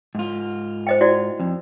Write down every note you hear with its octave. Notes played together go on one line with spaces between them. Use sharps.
G#2 F4
C5 D#5 G5
E4 F#4 D5
F2